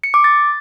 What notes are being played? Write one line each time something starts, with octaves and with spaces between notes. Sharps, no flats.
C#7
D6
A6